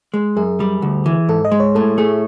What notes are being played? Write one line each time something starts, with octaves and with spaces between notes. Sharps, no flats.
G#3
F#2 G#4
G3
D2
E3
G#2 A4
D#5
G#3
C#5
A2 A4
A3 G#4